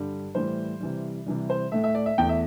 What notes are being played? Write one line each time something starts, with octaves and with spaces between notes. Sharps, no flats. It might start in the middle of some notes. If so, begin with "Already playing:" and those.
Already playing: G2 D3 G3
A2 E3 G3 C5
C3 E3 G3
C3 E3 G3
C5
A2 A3 E5
E5
D5
E5
E2 E3 A3 G5
E5